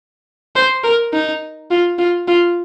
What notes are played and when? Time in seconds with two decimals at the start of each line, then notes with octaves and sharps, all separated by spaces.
0.56 C5
0.84 A#4
1.13 D#4
1.71 F4
1.99 F4
2.28 F4